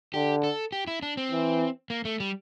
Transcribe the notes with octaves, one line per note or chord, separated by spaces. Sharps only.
D3 G4
A4
G4
E4
D4
C4
E3
A#3
A3
G3